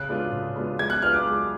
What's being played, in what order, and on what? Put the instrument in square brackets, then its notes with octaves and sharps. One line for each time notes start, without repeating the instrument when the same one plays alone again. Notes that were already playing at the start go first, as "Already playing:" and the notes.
Already playing: [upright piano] C#3 [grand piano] F#6
[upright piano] G#3 B3 D4 F4
C#3
G#3 B3 D4 F4
[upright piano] G#3 [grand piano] G#6
[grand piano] F#6
[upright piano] D4 F4 G#4 B4 [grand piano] F6
[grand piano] D6
[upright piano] G#3